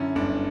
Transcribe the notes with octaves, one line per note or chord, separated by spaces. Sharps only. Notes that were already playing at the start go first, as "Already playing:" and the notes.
Already playing: F#2 D3 C#4 E4
G1 D4